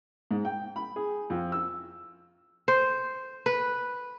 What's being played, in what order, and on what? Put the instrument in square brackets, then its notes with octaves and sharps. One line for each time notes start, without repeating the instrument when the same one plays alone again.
[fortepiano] G#2
G5
B5
G#4
F2
E6
[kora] C5
B4